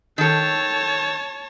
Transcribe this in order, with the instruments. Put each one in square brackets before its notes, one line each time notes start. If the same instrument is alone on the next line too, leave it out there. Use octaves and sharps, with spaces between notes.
[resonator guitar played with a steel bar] D#3 A4 [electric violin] C#5 A5